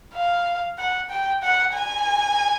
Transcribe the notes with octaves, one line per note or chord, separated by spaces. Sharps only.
F5
F#5
G5
F#5
G#5